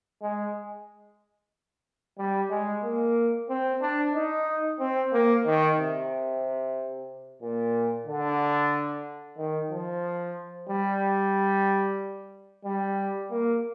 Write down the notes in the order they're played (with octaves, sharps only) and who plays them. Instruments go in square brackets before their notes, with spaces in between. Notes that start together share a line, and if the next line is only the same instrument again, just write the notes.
[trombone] G#3
G3
G#3
A#3
C4
D4
D#4
C4
A#3
D#3
C3
A#2
D3
D#3
F3
G3
G3
A#3